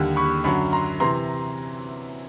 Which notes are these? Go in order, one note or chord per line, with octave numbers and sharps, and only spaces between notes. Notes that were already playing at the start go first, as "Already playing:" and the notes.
Already playing: D#2 D3 G3
B5 C#6
F#2 D3 F#3 B5 C#6
A#5 C6
C3 E3 A#5 C6